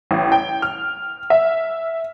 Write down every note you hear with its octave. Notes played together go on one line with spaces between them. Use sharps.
A1
G5
F6
E5